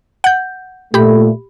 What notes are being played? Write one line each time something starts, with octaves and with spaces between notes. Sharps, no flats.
F#5 G6
A#2 A3 G4 B5